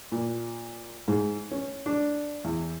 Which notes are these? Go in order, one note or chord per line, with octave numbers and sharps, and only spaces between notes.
A#2
G#2
C#4
D4
E2